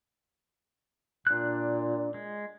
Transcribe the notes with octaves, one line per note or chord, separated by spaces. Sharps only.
A#2 D4 F#6
G#3